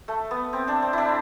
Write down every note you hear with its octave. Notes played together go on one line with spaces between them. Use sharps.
A3
B3
C4
D4
C4
D4 E4